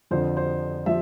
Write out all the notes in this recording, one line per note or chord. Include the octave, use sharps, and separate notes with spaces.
F2 D3 F3 C5
C5
F3 E5